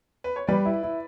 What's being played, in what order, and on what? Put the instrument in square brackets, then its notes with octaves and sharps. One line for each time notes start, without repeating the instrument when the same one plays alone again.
[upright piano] B4
C#5
[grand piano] G3 [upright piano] B4 D5
[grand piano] E4
E4